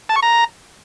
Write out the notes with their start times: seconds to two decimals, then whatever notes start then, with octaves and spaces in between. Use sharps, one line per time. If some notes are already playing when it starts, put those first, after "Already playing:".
0.09 A5
0.16 C#6
0.23 A#5